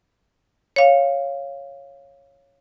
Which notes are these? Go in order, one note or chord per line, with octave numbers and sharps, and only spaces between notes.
C#5 F5